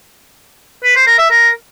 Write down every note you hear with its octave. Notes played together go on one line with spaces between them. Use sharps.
B4
C5
A#4
E5
A#4